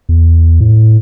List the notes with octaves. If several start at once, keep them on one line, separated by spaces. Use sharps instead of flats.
E2
A2